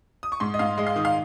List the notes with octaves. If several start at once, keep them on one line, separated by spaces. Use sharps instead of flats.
D#6
C#6
G#2 C6
D#5
G#2 F5
G#3 D#5
F5
D#3 D#6
F5